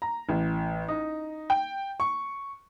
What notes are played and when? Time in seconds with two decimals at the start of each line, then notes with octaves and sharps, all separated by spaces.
0.02 A#5
0.29 A1
0.88 D#4
1.50 G5
2.00 C#6